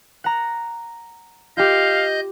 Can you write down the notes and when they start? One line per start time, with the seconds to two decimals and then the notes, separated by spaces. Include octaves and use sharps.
0.24 F#5 A#5
1.57 F4 G4 D#5 F5 G6